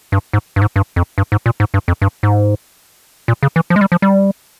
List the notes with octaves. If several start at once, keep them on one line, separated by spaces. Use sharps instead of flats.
G2
G#2
G2
G#2
G2
F2
G2
G#2
A#2
G#2
G2
F2
G2
G#2
A#2
C#3
E3
F3
G#3
G3
F3
G3